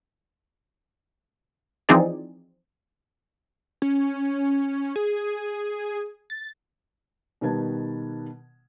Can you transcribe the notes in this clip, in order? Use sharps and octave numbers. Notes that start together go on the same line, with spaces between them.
E3 F3 C4 D#4 G#4 D5
C#4
G#4
A6
B2 D#3 G3 B4 A5 G#6